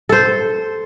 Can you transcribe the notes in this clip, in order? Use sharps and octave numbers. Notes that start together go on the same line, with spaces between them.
A4 C5